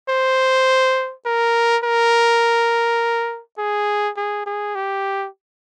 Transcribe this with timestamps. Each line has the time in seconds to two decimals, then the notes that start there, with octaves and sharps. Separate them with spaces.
0.09 C5
1.26 A#4
1.84 A#4
3.58 G#4
4.17 G#4
4.46 G#4
4.75 G4